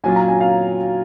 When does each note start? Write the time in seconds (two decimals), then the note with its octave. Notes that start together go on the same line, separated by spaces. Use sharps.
0.04 A#2 F#3 C#4 F4 G#5
0.16 A#5
0.28 G#5
0.40 F5